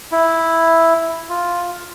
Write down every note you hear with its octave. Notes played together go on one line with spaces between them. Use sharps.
E4
F4